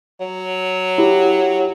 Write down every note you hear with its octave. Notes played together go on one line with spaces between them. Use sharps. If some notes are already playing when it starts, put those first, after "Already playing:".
F#3
E4 G4